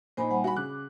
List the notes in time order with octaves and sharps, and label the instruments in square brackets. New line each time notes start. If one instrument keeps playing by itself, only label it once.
[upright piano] A#2 D#4 [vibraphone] C5 G#5 B5
[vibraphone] G3 F#5 G#5
[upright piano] F#4 B5
[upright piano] C#3 F#6 [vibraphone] D6